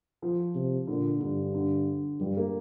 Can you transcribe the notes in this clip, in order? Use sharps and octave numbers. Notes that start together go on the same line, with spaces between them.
F3
C3
A#2 D3
G2 D3
D3
G2 G3
A#3